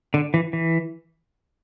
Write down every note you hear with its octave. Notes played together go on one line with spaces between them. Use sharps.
D3
E3
E3